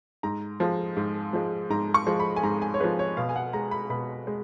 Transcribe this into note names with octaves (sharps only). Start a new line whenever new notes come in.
G#2 A#5
F3 G#3
G#2
F3 G#3
G#2 A#5
C#6
F3 G#3
B5
G#5
G#2 A#5
G#5
C#5
F3 G#3 B4
C#5
B2 F5
G#5
F#5
G#3 A#5
B5
B2 B5
G#3